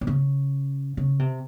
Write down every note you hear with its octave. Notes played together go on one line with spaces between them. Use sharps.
C3
C#3
C#3
C3